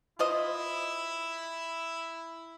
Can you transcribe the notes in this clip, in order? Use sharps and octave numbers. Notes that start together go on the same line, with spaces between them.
E4 F4 C5 D#5